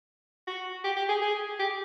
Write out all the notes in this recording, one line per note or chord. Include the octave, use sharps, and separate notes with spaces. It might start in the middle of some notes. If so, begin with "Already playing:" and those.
F#4
G4
G4
G#4
G#4
G4